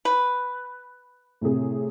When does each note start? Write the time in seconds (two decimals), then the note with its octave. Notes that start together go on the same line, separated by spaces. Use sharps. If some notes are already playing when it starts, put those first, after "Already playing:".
0.05 B4
1.41 A2 C3 G#4